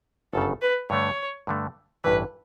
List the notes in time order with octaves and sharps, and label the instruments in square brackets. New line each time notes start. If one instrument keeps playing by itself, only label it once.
[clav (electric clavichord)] G1 F#2 C#3 [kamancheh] A4
[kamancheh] B4
[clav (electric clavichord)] G2 D3 A3 [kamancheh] C#5
[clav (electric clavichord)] G2 D3 A3
[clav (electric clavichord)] A1 G2 E3 [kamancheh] B4